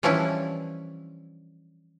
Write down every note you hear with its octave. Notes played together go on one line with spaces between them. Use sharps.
E3 F3 G3 C#4 D4 E4